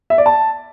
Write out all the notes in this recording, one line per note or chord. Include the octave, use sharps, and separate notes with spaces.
E5
D5
A5